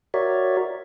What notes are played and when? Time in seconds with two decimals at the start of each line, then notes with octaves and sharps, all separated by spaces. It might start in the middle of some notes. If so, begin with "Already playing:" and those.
0.14 F#4 A#4 C#5 D5 E5